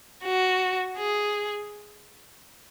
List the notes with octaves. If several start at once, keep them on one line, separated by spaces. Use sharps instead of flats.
F#4
G#4